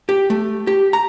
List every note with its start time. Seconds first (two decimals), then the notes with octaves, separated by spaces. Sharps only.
0.09 G4
0.30 A3
0.67 G4
0.93 A#5